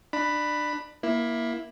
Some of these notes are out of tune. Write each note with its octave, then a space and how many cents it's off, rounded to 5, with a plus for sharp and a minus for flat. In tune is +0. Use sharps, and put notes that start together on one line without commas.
D4 +25 B5 +0
A#3 +20 E4 +0